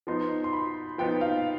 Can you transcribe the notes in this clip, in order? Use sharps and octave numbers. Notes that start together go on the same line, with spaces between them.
F3 B3 D#4 C6
C6
B5
F3 B3 D#4 G5
F5